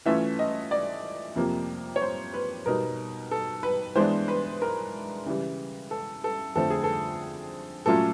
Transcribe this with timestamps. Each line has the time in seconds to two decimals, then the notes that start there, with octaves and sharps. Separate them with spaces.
0.06 E3 A3 C#4 F4 E5
0.39 D#5
0.71 D5
1.36 F2 C3 F3 A#3
1.96 C#5
2.02 C5
2.34 B4
2.66 B2 G3 B3 D#4 A#4
3.31 A4
3.63 B4
3.96 E3 G#3 B3 D4 C5
4.28 B4
4.62 A#4
5.26 C#3 E3 G3
5.91 A4
6.24 A4
6.55 F2 D3 F3 A3 C4 A4
6.70 G#4
6.84 A4
7.86 A#2 F#3 A3 C#4 F4 A4